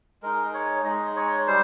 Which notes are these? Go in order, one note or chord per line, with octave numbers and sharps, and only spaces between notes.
G#3 D#4 A#4
C#5
G#3 D#4 D#5
C#5
G3 C5